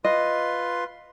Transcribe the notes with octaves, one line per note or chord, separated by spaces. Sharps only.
F4 B4 D#5 C6